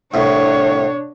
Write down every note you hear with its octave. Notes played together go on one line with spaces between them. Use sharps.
C2 A2 D4 C#5